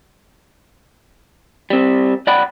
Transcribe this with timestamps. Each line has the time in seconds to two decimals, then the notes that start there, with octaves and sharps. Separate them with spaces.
1.70 G3 C4
2.27 B1 D5 F#5 G5 B5